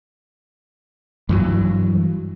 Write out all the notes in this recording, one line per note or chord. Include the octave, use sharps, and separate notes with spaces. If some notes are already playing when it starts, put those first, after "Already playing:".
G2 E3 F#3